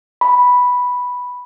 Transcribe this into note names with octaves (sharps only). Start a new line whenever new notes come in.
B5